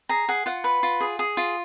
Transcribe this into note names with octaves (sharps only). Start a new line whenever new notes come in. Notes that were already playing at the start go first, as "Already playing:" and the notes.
G#4 A#5
G#4 F#5
F4 F#5
B4
F4
G#4
G#4
F4